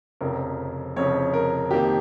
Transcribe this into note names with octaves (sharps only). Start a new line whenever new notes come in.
F1 F2 C#3 A#4
F1 F2 C#3 C#5
A#4
F2 D#3 A#3 G4